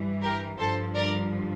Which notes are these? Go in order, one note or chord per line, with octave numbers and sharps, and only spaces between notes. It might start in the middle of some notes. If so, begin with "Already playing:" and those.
Already playing: G2 E3 G3
G4 A#4
G2 D3 F3 A4 C5
A#4 D5